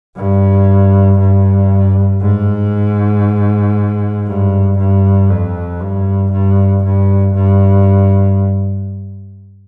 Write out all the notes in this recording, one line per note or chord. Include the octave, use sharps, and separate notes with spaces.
G2
G2
G#2
G2
G2
F2
G2
G2
G2
G2